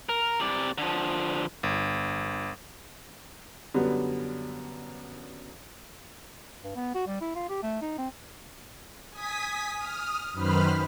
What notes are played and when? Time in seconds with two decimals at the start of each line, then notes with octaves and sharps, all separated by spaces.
0.09 A#4
0.40 C3 D5
0.78 D3 F3
1.63 G1
3.74 F#2 D3 G3 B3
6.64 G2
6.76 B3
6.95 F#4
7.07 G3
7.21 E4
7.35 F4
7.49 G4
7.63 A3
7.82 D#4
7.98 C4
9.10 G#5 D#6 B6
9.77 D#6 F6
10.33 F#2 D#3 B4 C5 B5 F6